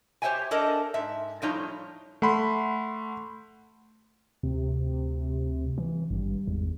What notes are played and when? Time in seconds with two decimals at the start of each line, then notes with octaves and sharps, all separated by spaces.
0.22 G4 C5 C#5 E5 G5 G#5
0.51 D4 A4 A#4 D#5
0.94 G#2 E5
1.42 A2 F3 G3 D#4 C#5 A#5
2.22 A3 F#5 B5 C6
4.43 D2 C3
5.78 E3
6.11 G#1 G2
6.47 G#1 E2